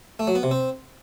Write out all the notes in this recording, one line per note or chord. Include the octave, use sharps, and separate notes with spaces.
A3
F#3
B3
C3
C4